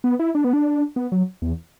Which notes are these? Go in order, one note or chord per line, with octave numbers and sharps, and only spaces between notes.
B3
E4
D4
B3
D4
B3
F#3
E2